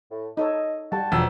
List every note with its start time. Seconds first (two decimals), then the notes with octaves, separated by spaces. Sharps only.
0.11 A2
0.37 D#4 A4 C#5 D#5
0.92 G3 F#4 G5 A5
1.12 E1 F3 E6